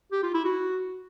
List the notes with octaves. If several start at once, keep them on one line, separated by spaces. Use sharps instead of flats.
G4
F4
E4
F#4